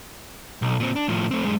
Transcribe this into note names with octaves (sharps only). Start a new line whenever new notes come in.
B1
A#2 C4
D4
A2 F3
A3 C4
F#2 G#3